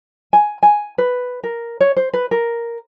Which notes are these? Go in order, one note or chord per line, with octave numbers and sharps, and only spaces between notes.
G#5
G#5
B4
A#4
C#5
C5
B4
A#4